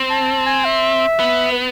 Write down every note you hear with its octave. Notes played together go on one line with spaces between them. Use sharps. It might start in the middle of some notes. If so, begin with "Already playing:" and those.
Already playing: C4
A5
G#5
E5
B3
B4